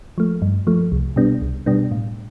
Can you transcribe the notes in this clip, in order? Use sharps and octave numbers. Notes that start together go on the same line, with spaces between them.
F3 A3
G2
F3 A3
C2
B2 G3 B3 D4
C2
B2 G3 B3 D4
A2